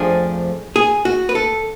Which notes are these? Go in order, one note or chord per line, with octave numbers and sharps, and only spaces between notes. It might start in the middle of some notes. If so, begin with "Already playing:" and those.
Already playing: F2 F3 A3 D4 G#4
G#4
F#4
B4
A4